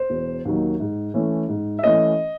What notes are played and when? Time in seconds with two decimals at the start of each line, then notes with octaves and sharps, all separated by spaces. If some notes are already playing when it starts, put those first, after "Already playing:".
Already playing: C5
0.10 E1
0.45 D#2 D#3 F#3
0.80 G#2
1.14 E3 A3 C#4
1.49 G#2
1.79 E5
1.82 E3 A3 C#4 D#5